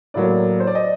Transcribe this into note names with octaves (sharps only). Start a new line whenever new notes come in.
A2 F#3 A#3 D5
C5
D5
D#5